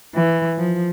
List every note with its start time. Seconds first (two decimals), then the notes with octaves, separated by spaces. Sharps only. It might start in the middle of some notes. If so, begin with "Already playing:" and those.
0.16 E3
0.58 F3